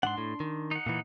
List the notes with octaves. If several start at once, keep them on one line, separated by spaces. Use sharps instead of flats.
G#2 D#3 D4 F#5 C6
A2
D#3
D#4 F#5
A#2 E3